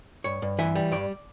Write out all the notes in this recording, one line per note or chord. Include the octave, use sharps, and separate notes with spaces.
G2 C#5
G2
E3 E5
G3
G2 D5